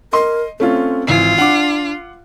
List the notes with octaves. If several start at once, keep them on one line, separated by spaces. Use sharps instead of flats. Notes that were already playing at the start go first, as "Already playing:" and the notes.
A#4 D#5 C6
A3 C4 C#4 F4
G#1 E3 F4 C7
D4 F#5 D6